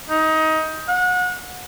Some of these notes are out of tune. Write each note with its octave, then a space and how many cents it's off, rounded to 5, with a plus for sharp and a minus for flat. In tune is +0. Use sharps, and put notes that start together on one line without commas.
D#4 +20
F#5 -30